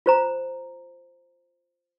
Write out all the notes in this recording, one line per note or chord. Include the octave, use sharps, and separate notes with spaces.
F4 C5 A#5